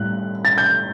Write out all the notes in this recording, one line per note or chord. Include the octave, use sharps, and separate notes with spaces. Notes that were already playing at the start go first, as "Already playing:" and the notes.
Already playing: A2 G3 F#6
A6
G6